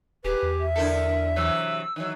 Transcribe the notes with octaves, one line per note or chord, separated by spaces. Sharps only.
D#1 G4 G#4 B4
E2
E5
D3 E4 A4 A#4
C3 E3 F#3 E6
D#3 E3 F#3